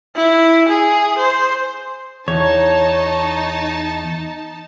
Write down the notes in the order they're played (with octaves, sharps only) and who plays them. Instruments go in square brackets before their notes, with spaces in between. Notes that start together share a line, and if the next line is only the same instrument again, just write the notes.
[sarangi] E4
G#4
C5
[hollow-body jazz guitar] E2 [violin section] D#4 A5 [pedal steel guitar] C#5